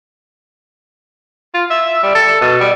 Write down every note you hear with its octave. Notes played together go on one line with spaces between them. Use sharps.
F4
E5
G3
A4
B2
G3